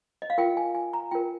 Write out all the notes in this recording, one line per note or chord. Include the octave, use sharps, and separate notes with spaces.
D#5
F5
F4 A#4 G5
G#5
G#5
A#5
F4 A#4 G5